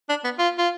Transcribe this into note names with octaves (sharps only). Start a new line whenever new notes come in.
D4
B3
F4
F4